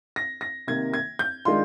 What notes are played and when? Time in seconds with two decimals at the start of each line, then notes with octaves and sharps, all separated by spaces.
0.16 A#6
0.41 A#6
0.67 C3 D#3 A#3 G#6
0.94 G#6
1.19 G6
1.45 D#3 G#3 D4 F4 C6